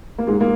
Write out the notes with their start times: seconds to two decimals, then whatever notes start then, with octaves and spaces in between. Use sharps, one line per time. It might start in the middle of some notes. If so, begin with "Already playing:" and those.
0.18 A#3
0.27 G#2 G#3
0.41 A#3